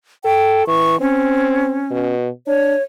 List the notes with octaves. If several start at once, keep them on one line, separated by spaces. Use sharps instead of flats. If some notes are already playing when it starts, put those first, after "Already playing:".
A4 G5
E3 C#6
C4 C#4
B2
D4 C#5